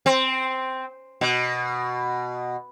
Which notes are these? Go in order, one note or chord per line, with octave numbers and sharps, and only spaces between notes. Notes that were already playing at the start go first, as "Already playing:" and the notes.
C4
B2